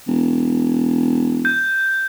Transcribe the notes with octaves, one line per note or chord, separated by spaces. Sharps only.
E1
G6